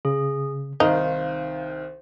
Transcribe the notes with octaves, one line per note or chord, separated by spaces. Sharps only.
C#3 G#4
C2 D#3 D#4 C5 F5